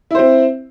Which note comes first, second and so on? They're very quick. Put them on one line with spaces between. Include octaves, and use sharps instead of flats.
E4 C5 C4